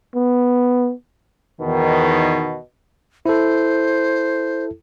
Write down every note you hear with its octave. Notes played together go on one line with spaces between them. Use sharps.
B3
E2 B2 D#3
E4 A4 C5